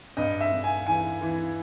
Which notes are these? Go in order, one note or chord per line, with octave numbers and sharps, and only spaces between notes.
G2 D#5
E5
G2
G#5
E3 G#5
E3